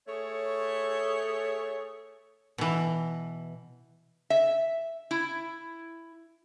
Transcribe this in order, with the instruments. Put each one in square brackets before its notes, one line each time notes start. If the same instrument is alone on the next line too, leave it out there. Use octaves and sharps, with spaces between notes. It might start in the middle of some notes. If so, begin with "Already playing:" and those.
[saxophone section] A3 G#4 C#5
[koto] B2 E3
[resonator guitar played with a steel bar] E5
E4